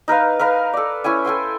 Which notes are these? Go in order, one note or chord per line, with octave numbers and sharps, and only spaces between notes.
D#4 A#4 B4 F5
A#4 B4 F5 A#5
A4 D5
C#4 E4 G5 G#5
A4 G5 G#5 C6